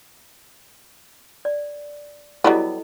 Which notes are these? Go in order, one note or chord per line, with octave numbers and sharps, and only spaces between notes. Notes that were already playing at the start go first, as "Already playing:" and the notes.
D5
F#3 G3 B3 E4 A4 D#5